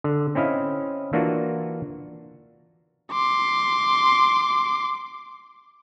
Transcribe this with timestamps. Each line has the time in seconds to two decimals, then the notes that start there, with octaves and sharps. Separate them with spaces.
0.04 D3
0.35 C4 C#4 E4 D#5 F5
1.13 E3 A#3 D4 F4 F#4
3.12 C6 D6